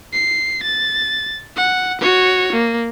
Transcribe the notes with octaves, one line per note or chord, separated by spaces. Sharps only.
C7
A6
F#5
F#4 C#5
A#3